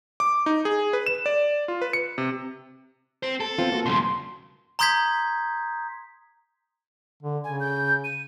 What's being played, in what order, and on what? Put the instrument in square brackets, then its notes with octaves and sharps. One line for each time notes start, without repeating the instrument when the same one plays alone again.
[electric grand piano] D6
D#4
G#4
B4
E7
D5
F4
B4
C#7
C3
[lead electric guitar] C4 C5
A4
[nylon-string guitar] B3 C4 F4
A#3 F#4
[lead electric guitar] B1 C#3 [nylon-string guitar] E2 [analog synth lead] C6
[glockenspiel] A#5 C6 D#6 G6 G#6 B6
[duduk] D3
[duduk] C#3 [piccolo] G#5
[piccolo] G6
D#7